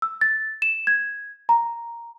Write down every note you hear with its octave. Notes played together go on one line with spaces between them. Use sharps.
E6
A6
E7
G#6
A#5